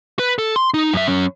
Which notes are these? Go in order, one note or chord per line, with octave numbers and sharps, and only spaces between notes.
B4
A4
C6
D#4
F#2 E5
F#2 C#4